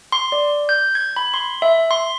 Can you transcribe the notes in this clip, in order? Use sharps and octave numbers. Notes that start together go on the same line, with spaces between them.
C6
D5
G6
G#6
B5
C6
E5
C6